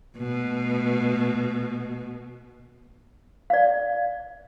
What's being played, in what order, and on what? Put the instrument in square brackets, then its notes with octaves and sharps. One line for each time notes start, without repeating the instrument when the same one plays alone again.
[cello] B2 A3
[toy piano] D5 F5